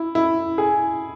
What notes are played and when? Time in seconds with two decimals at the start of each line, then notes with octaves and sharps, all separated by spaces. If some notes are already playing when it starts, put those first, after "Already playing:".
Already playing: E4
0.15 E4
0.58 G#4